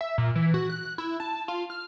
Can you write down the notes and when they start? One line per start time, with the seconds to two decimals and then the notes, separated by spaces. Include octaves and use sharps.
0.01 E5
0.18 A#2
0.35 E3
0.54 F#4
0.70 F#6
0.98 E4
1.20 A5
1.48 F4
1.70 F6